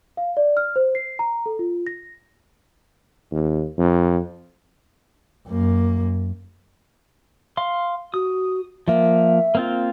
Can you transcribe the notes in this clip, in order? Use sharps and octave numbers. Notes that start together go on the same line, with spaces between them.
F5
D5
F6
C5
C7
A#5
A4
F4
A#6
D#2
F2
F#2 A#3
F5 C6
F#4 D#6
F3 A#3 E5
A#3 C4 F4